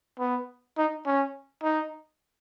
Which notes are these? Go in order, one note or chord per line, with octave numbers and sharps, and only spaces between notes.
B3
D#4
C#4
D#4